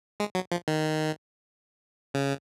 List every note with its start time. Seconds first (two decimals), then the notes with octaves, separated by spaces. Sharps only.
0.20 G#3
0.35 F#3
0.52 F3
0.68 D#3
2.14 C#3